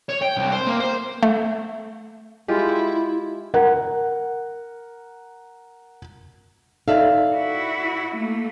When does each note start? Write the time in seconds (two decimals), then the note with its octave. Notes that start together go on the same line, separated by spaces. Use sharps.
0.09 C#5
0.22 G5
0.37 C2
0.52 C5
0.67 A#3
0.80 C5
1.23 A3
2.48 G#3 E4 F4 G4
3.54 A#4 F#5
6.88 D#4 A4 D5 E5 F5
7.35 E4 F#4
8.15 A3 A#3